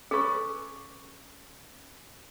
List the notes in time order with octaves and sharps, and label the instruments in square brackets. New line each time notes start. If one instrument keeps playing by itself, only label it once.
[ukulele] C#4 A4 B4 [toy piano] G#4 C#6